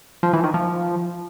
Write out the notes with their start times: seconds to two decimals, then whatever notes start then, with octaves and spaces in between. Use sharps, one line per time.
0.23 F3
0.33 E3
0.44 D#3
0.54 F3